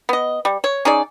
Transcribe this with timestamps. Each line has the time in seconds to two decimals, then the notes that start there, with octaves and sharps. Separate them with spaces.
0.09 B3 D#5
0.45 G3
0.64 C#5
0.85 C#4 D#4 G#4 D5